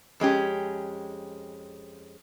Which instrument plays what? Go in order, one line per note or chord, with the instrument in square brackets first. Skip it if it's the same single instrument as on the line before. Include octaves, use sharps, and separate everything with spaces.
[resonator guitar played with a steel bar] F2 G#3 C#4 G4